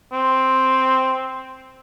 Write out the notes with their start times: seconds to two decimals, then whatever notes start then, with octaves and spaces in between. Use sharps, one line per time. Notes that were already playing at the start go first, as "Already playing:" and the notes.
0.13 C4